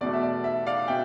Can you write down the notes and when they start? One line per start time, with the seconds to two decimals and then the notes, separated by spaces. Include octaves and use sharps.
0.01 E2 B2 A3 D5
0.14 E5
0.23 D5
0.44 E5
0.66 D5 F5
0.88 B2 E5 G5